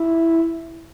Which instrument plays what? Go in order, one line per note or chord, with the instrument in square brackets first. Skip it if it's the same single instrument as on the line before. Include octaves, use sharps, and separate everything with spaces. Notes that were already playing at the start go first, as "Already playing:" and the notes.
Already playing: [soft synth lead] E4